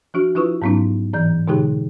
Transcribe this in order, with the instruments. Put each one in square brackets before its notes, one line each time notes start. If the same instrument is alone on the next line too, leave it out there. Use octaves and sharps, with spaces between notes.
[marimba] F3 D4 F#4
F3 D4 E4 F4 B4 C#6
G#2 F#3 B3 C#4 D#4
A2 E3 D5 G6
B2 D3 G#3 D#4 G4 G#4